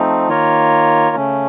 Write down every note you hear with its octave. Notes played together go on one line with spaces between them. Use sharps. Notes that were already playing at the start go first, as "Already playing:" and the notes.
Already playing: F3 A3 C4 D#4
D#3 A#3 F4 A#4 C#5
C#3 A3 C#4